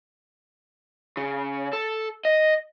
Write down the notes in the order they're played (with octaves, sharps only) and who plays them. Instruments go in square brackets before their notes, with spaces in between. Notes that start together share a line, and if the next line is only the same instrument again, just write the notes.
[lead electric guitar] C#3
A4
D#5